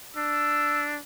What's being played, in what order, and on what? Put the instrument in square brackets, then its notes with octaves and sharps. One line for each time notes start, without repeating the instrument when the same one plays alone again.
[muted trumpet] D4 [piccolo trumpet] E6